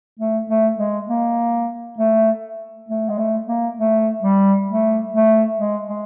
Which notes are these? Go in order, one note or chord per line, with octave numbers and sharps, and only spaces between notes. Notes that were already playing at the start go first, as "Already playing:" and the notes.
A3
A3
G#3
A#3
A3
A3
G#3
A3
A#3
A3
G3
A3
A3
G#3
G#3